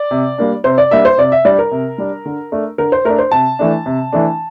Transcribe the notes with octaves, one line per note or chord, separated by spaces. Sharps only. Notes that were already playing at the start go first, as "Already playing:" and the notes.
Already playing: D5
C3
G3 A#3 D4
C3 C5
D5
G3 A#3 D4 E5
C5
C3 D5
E5
G3 D4 D5
A#4
C3
G3 D4
D3
A3 D4
D3 A#4
C5
A3 D4 A#4
C5
C3 A5
E3 A3 D4
C3
E3 A3 D4